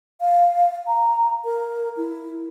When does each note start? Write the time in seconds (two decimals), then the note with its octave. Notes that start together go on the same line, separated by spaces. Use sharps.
0.21 F5
0.87 A#5
1.44 A#4
1.97 E4